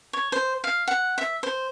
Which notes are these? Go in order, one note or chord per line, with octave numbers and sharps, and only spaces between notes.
C#5
C5
F5
F#5
E5
C5